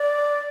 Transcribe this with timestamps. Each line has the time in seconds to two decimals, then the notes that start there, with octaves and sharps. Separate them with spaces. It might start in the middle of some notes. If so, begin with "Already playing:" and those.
Already playing: D5